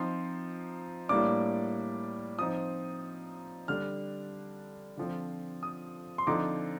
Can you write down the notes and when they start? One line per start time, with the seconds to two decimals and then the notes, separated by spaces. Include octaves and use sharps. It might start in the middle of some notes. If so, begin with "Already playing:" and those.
Already playing: F3 C4 D#4 C6
1.09 A2 G3 A#3 D4 D6
2.39 F3 C4 D#4 D#6
3.68 D3 G3 D4 F6
4.97 D3 F3 C4
5.63 D#6
6.18 C6
6.27 D3 F3 C4 D#4 D6